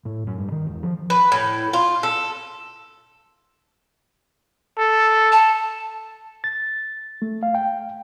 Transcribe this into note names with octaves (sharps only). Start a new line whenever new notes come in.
A2
F#2
G2
D#3
E1
F3
B4
A2
F4
A4
A4
A5
A6
A3
F5
G5